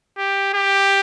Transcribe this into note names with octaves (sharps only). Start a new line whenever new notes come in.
G4
G4